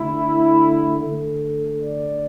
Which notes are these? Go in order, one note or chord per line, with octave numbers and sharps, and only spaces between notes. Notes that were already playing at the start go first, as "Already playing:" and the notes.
Already playing: D3 A3 E4
D3 A3 A4
D5